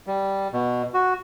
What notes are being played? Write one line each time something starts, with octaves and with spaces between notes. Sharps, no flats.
G3
B2
F#4